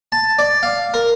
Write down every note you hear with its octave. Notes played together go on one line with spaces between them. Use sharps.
A5
D5
F5
A#4